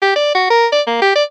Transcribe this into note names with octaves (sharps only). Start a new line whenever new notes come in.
G4
D5
F#4
A#4
D5
A#3
G4
D5